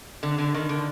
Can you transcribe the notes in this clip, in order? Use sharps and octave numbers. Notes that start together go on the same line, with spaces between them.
D3
D3
D#3
D3